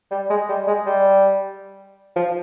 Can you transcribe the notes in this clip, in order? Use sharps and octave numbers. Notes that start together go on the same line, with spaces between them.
G3
G#3
G3
G#3
G3
F3